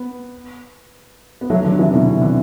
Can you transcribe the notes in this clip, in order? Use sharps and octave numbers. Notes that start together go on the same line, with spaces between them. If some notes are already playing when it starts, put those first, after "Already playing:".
Already playing: B3
B3
F#3 A3
D3 F#3
C3 E3
B2 D3
C3
D3